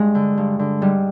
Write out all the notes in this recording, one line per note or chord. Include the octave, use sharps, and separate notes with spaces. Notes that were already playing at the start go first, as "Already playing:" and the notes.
Already playing: G2 G#3
D3
G2
D3
G#2 G3